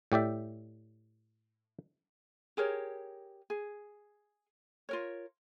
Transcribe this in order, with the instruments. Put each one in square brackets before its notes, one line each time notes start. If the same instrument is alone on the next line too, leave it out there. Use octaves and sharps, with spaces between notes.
[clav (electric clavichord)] A2 G4 D5 E5
[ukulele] G4 G#4 A#4 C#5
G#4
F4 A#4 C#5